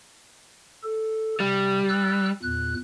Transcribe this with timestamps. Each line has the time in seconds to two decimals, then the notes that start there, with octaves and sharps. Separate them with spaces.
0.84 A4
1.40 C3 G3
1.89 E6 F#6
2.43 E2 A#2 F#6